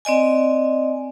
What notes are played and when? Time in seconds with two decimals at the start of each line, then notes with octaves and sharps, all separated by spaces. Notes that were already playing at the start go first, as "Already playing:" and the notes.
0.05 C4 D5 D#5 G#5